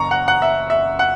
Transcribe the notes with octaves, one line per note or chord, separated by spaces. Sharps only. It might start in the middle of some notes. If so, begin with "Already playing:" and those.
Already playing: F#1 F#2 A#5 C#6
F#5
F#5
E5
E5
F#5